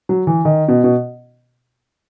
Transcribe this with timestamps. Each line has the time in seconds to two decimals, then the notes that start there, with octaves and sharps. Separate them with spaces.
0.09 F#3
0.27 E3
0.45 D#3
0.68 B2
0.84 B2